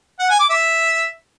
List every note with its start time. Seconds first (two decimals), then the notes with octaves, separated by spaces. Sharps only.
0.19 F#5
0.30 G#5
0.40 D6
0.50 E5